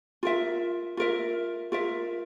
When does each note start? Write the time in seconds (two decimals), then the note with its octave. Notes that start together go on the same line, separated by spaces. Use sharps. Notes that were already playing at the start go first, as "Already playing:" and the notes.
0.23 F4 A#4 E5
0.97 F4 A#4 E5
1.72 F4 A#4 E5